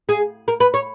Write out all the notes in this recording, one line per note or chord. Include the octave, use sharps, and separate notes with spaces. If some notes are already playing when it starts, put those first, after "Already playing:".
G#4
A#4
B4
C#5